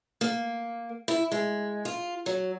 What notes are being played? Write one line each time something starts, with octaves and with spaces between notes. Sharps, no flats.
A#3
E4
G#3
F4
F#3